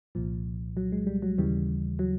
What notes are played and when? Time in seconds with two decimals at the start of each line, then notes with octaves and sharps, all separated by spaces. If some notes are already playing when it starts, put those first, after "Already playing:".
0.15 C2 A#2 F3
0.77 F#3
0.92 G#3
1.07 G3
1.22 F#3
1.38 D#2 C#3 E3 G3
1.99 F#3